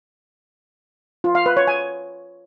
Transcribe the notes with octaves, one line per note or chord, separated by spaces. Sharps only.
F4
F5
B4
C#5
G#5